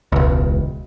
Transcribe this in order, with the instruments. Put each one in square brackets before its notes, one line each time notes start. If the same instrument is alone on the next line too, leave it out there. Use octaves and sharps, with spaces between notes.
[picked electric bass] E1 C#2